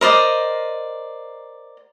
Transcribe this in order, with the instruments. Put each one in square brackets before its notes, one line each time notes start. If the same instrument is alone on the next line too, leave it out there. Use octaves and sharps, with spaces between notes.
[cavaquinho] A#4 C5 D5 D#5